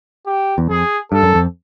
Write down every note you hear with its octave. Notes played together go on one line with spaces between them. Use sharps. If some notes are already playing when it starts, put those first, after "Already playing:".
G4
E2
F2 G#4
G2 A4
F#2
F2